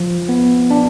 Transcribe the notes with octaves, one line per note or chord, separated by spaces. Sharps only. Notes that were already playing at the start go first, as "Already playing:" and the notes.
Already playing: F3
B3
D4